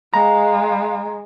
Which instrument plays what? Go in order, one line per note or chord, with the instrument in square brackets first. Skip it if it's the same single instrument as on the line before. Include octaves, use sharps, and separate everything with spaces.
[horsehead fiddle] G#3 [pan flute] F5 [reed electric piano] A#5